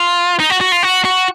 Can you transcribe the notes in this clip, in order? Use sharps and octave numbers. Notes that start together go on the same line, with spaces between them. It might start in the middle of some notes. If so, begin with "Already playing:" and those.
Already playing: F4
D#4
F#4
F#4
F4
F#4
F#4